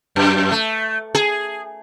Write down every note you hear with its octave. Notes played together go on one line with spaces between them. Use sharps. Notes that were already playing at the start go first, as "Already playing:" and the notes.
F#2
A3
G#4